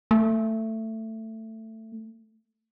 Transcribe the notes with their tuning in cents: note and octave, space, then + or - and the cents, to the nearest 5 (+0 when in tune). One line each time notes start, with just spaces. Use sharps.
A3 +15